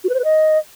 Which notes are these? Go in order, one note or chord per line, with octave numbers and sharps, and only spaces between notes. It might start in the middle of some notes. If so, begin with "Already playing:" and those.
F#4
B4
C5
B4
D#5